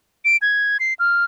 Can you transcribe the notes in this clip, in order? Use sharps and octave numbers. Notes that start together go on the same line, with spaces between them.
D7
G#6
C7
F6